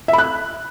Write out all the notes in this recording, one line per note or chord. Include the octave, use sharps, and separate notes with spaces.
E5
B5
F#6